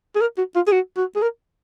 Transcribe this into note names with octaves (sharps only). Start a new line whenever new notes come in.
G#4
A#4
F#4
F4
G#4
F#4
F#4
G#4
A#4